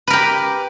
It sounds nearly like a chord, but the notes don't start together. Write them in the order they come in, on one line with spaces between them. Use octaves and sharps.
B4 A#4 G4